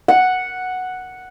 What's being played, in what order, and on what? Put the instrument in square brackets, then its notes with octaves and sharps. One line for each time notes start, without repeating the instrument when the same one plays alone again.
[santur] F#5